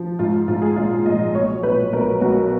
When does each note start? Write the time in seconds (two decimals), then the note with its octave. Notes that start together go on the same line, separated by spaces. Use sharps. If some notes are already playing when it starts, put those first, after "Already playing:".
Already playing: F3
0.19 G#2 F4
0.48 G#2 F4
0.62 G#4
0.76 A#1 F4
1.06 A#1 D#5
1.35 B1 C#5
1.63 B1 B4
1.93 B1 A#4
2.21 B1 F#4